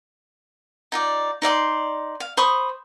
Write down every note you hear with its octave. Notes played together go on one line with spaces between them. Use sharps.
D#4 F4 D5
D#4 D5 F5 C6
F5
C5 B5 C#6 D#6